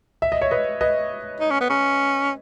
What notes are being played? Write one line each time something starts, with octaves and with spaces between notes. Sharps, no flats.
E5
D#5
C#5
B4 D#5
B4 D#5
D#4
C#4
B3
C#4